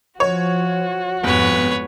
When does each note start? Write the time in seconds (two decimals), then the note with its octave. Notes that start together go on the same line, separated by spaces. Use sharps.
0.20 F3 F#4 C#5
1.23 G1 F2 G#2 B3 B4 C#5